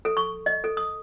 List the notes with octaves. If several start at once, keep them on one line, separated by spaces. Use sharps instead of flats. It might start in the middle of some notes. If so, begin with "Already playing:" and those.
A4
C#6
D#5
A4
D#6